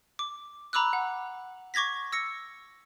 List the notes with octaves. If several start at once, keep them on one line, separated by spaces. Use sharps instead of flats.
D6
A#5 B5 D6 E6 F#6
F#5
C#6 D6 G#6 A#6 B6
E6 A#6 C#7